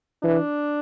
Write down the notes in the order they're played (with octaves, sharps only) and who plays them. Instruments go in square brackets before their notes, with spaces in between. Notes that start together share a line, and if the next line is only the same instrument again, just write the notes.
[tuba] E3 [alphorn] D4